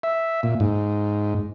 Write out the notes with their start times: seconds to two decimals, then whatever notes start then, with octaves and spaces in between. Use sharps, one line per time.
0.03 E5
0.43 A#2
0.60 G#2